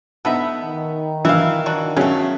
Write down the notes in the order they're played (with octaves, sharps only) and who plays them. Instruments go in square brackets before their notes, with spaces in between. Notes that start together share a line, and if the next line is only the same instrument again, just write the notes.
[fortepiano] B3 D#4 [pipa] A4 B4 E5
[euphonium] D#3
[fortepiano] E3 [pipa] E5 F5
[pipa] D4 D#4 F#4
[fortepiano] C#3 F#3 [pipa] A3 C#4